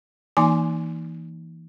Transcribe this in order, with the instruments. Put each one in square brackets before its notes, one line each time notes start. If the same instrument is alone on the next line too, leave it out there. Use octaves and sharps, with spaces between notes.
[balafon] E3 A#3 D#4 G#5 C6 D6